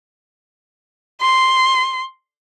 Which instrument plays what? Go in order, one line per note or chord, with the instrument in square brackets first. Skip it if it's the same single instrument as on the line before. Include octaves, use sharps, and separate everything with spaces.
[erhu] C6